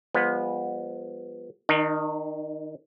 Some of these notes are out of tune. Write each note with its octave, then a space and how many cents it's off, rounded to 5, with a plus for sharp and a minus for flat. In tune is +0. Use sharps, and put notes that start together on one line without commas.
F3 +0 G#3 -45 B3 -10
D#3 +0 D#4 -45